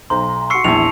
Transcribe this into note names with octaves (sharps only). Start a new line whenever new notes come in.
B1 C5 A#5 C6
F#4 C#6 E6 C7 C#7
A#1 E2 E4 A5 F7